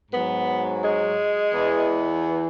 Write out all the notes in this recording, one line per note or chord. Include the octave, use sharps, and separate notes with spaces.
G#2 F#3 B3
G#3
E2 E3